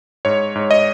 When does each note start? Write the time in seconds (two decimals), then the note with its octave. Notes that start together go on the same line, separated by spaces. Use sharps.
0.25 G#2 C#5
0.55 G#2
0.71 D#5